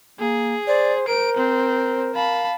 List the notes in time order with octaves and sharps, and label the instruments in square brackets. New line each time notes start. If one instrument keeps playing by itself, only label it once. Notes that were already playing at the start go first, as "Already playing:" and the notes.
[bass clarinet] A#3 [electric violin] G#4
[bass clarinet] C5 [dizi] D5
[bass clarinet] A#4 [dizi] C5 [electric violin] D7
[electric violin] C4
[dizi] F5 [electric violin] A5 B5